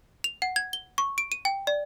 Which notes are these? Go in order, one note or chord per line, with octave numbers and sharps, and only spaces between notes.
F7
F#5
G#6
G7
C#6
D7
D#7
G5
D5